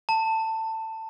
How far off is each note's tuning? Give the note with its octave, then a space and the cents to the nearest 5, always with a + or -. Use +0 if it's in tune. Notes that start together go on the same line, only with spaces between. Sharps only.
A5 +20